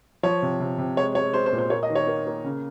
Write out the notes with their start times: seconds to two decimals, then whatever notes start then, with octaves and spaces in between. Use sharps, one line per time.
0.23 F3 C#5
0.43 C3
0.60 C3
0.78 C3
0.97 G#3 C#5
1.15 G#3 C#5
1.34 G#3 C5
1.46 C5
1.53 A#2
1.58 C5
1.70 A#3 C#5
1.83 D#5
1.90 D#3
1.95 C#5
2.07 A#3
2.27 A#3
2.44 C#3